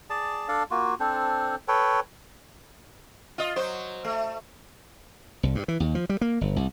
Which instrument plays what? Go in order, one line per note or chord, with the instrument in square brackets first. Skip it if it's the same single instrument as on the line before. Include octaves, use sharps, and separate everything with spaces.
[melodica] G#4 D5 A5
D4 A4 D5 F5
A#3 F4 F#4
C4 D4 A4 C5
A4 B4 C#5 G5
[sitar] F4 D#5
F#3 C5
A3
[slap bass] C2
G2
E3
D#2
F3
G3
A#3
G1
C2